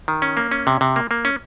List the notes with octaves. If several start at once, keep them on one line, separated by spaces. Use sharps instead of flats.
D#3
C#4
A#3
C#4
C3
C3
A#3
A#3
C#4